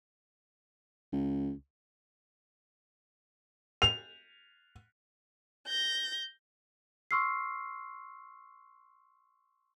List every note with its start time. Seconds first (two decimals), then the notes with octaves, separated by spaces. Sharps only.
1.12 C#2
3.82 F7
5.68 G6 A#6
7.11 C6 C#6 E6 F6 C7